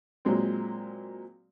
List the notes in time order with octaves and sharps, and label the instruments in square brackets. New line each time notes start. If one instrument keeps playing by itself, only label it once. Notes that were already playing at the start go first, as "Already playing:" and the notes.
[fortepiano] A#2 F#3 G#3 C4